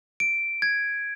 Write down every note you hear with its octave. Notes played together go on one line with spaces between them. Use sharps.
D7
G#6